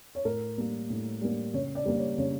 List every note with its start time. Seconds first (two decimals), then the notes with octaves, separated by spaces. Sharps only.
0.15 C#5
0.25 A2 A#4
0.57 G3 A#3
0.90 A2
1.21 G3 A#3
1.54 C#3 C#5
1.75 D5
1.85 G3 A#3
1.97 C#5
2.18 C#3 C#5